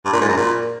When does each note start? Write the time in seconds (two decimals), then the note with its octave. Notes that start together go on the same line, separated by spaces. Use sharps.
0.05 G2
0.13 A#2
0.21 G#2
0.29 F#2
0.37 A#2